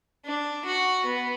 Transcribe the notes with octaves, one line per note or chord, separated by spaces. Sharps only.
D4
F#4
B3